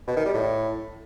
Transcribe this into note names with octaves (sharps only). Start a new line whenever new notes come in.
B2
D#3
G3
A2